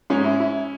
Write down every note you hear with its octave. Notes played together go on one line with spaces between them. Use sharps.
G#2 C#4
E4
E4